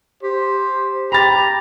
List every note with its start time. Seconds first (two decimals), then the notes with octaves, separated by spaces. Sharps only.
0.23 G4 C5
1.12 G4 A#5 B5 A6